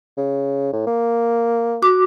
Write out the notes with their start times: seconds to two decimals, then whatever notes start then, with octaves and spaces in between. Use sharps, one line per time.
0.17 C#3
0.73 A2
0.87 A#3
1.82 F#4 D6